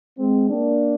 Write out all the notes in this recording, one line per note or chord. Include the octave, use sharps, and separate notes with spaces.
G#3 C4
A#3 D4